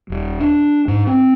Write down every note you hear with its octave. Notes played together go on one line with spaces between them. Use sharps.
D#1
D4
G#2
C4